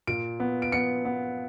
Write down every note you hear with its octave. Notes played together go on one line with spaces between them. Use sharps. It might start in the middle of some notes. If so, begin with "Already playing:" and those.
A#2 D7
B3
D7
B3 C#7
B3